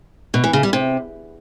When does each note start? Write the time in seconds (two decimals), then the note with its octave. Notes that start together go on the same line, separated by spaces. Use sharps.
0.34 B2
0.44 E3
0.53 C#3
0.63 G3
0.73 C3